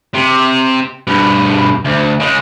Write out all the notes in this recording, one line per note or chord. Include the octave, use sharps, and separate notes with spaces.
C3
G2 B2
D2
C#3 G#3